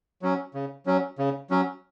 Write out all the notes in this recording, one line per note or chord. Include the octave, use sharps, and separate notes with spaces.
F#3 C#4
C#3
F#3 C#4
C#3
F#3 C#4